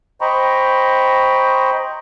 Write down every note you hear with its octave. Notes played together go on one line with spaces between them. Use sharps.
C5 D#5 G5 A#5 B5 C#6